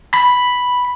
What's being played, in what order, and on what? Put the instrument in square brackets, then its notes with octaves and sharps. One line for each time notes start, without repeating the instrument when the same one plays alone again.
[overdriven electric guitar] B5